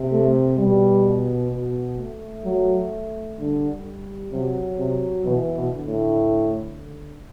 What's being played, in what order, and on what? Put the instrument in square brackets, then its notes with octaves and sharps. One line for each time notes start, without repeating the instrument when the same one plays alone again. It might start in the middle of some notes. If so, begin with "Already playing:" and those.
Already playing: [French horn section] C3
[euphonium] A3
[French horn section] B2 [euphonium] G3
[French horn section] B2
A3
[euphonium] F#3
[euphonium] D3 [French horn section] G3
[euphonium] C3 [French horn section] F#3
[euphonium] C3
[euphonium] B2 [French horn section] E3
[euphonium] B2
[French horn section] D3
[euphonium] A2
[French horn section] D3